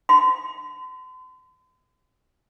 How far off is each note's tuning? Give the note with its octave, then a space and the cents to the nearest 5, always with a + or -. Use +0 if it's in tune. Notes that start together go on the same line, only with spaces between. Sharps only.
C6 -40